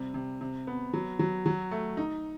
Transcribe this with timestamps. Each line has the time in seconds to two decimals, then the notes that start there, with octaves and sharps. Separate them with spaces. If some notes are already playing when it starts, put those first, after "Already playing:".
Already playing: C3 G3
0.14 C3
0.41 C3
0.67 B3
0.93 F#3
1.19 F#3
1.46 F#3
1.71 A3
1.97 D#4